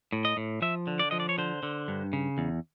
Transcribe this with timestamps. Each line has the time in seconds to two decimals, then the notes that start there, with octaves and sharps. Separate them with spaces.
0.12 A2
0.25 D#5
0.37 A2
0.62 F3 E5
0.87 D3
0.99 D5
1.11 F3 D#5
1.20 D5
1.29 C#5
1.38 D3 C5
1.63 D3
1.88 G2
2.13 C#3
2.38 E2